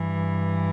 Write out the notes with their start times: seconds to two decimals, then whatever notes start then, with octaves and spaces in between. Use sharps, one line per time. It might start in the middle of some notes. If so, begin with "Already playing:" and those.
Already playing: G2 E3